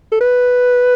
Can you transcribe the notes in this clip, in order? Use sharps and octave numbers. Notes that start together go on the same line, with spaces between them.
A4
B4